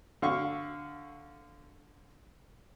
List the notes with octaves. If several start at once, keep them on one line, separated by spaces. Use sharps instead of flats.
D3 F5 C#6